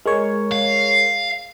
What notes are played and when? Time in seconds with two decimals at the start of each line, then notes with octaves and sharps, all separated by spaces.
0.06 G#3 A#4 C#5
0.52 F5